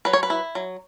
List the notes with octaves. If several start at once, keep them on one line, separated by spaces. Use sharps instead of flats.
F#3 B4
C#5
B4
E4
F#3